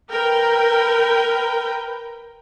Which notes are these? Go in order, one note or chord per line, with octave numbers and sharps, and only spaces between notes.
A#4 B4 G5